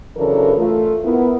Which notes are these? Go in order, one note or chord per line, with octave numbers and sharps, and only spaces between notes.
C#3 E3 F#3 D4 A4 A#4
A3 F4
B3 E4 A#4